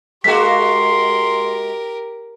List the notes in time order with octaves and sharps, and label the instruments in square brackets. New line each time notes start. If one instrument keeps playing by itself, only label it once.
[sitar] G#3 A#3 F#4 [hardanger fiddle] G4 A#4 [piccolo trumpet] C6 [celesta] B6